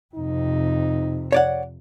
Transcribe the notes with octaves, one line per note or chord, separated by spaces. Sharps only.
F2 C3 D#4
C#5 D5 F#5